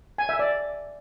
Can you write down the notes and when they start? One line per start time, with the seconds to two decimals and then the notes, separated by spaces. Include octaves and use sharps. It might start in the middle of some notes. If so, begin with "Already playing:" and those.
0.18 G#5
0.29 E5
0.39 D5